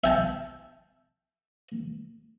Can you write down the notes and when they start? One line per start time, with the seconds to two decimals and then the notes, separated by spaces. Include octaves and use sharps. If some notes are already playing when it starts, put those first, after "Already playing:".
0.04 E5 G5 A5